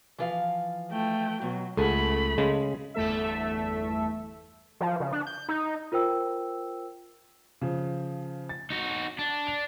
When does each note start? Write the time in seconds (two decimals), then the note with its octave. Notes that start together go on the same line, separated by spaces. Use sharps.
0.18 E3 F3 F5
0.91 A3 G5
1.42 B2 F#3
1.77 C#2 A3 G#4 A4 F#5 B5
2.38 C#3 G#3
2.94 G1 E2 A3 A4 E5
4.81 F3
5.00 C#3
5.13 D4
5.27 G6
5.49 D#4
5.92 F4 A#4 C5 G5 E6
7.61 C#3 F3
8.49 A6
8.70 D#4 F#4
9.19 D4
9.47 F7